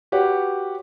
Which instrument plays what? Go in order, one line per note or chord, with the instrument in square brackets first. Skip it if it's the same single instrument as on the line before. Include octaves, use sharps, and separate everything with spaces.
[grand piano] F#4 G4 B4 C#5 F#5